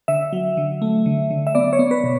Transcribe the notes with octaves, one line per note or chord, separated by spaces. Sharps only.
D3 E5
F#3
D3
A3
D3
D3
E5
B3 D5
C#5
B3
B4
B2